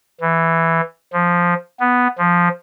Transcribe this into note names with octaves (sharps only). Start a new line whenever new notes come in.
E3
F3
B3
F3